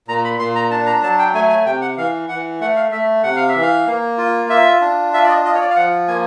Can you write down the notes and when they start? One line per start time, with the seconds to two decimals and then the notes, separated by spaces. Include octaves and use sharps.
0.08 A#2 A#5
0.24 B5
0.39 A#2 C6
0.56 A#5
0.71 D4 A5
0.86 A#5
1.03 F#3 A5
1.19 G5
1.34 A3 G#5
1.50 G#5
1.65 C3 G5
1.82 F#5
1.97 E3 F5
2.28 E3 F#5
2.60 A3 F#5
2.76 F5
2.92 A3 E5
3.24 C3 F#5
3.36 F5
3.49 E5
3.56 E3
3.62 F5
3.87 A#3
4.18 F4
4.49 F4 E5
4.81 D4
5.14 F4 E5
5.23 D5
5.28 D#5
5.44 F4 D#5
5.54 C#5
5.61 D5
5.70 F5
5.76 F3 F#5
6.08 A#3 G#5